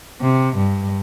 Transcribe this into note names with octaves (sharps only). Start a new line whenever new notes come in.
C3
G2